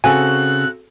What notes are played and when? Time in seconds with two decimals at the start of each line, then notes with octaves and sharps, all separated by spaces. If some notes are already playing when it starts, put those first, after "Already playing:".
0.04 C#3 C4 F#4 A4 G#5 F#6